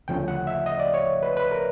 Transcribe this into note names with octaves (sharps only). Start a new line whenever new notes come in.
D2 C#3 F3 A3 C#4 G5
F#5
E5
D#5
D5
C#5
B4
B4
A#4